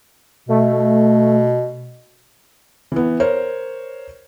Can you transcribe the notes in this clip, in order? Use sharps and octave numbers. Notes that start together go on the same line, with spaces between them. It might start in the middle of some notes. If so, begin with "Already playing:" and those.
B2 A3
E3 B3
A#4 C5 C#5